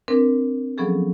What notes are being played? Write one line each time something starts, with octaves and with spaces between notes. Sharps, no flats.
C4 D4 A#4 B4
F3 F#3 B3 C#4 G#4 A4